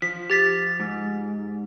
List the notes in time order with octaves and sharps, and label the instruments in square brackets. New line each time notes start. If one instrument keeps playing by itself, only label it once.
[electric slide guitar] F3 [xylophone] B6
[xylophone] G4 A6 B6
[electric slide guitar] G#2